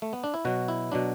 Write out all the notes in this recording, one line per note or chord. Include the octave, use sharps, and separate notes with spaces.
A3
B3
D4
E4
B2 F#3 F#4
E4
B2 F#3 D4